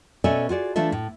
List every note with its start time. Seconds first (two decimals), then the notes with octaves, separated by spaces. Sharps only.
0.24 B2 C#4 A4 D5 E5 G#5
0.49 F4 F#4 G#4 D5
0.76 E3 A3 D4 F4 A4 E5
0.92 A2